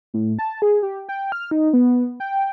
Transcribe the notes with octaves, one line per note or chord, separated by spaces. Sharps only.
A2
A5
G#4
G4
G5
F6
D#4
B3
G5